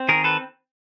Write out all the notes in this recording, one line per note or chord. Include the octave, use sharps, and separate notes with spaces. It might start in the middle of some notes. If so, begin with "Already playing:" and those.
Already playing: C4
D#3 G#4 A#4
A4 B4